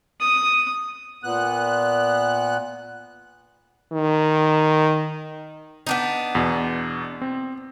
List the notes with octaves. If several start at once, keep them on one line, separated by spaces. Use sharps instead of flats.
D#6
A#2 B3 F#6
D#3
B3 D4 D#4
E2 B2
C4